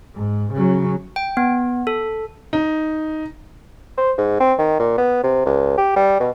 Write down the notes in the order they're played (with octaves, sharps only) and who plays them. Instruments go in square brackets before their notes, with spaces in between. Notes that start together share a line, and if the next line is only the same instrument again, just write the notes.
[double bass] G#2
C#3 F#3
[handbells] G5
B3
A4
[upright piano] D#4
[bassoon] C5
G#2
C4
D#3
A#2
B3
C3
C#2
G4
G3
B2